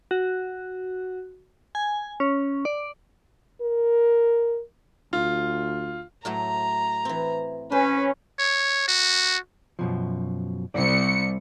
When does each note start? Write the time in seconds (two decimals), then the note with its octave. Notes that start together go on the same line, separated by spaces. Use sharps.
0.11 F#4
1.75 G#5
2.20 C#4
2.65 D5
3.62 A#4
5.13 D2 F4
6.25 A2 F#3 A3 A#5
7.05 E3 C4
7.72 C#4 B4 C5
8.39 C#5
8.88 F#4
9.79 F#2 B2 F3
10.74 C2 D5 C#7